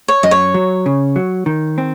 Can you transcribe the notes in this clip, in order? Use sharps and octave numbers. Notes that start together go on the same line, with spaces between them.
C#5
F#2 D#5
C#5
F#3
C#3
F#3
D#3
C4